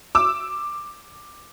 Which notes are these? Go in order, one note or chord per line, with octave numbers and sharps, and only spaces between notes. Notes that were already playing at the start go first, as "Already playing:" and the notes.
D6 E6